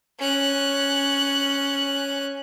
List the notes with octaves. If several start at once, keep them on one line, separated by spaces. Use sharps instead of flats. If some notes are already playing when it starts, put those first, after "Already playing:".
C#4 F#6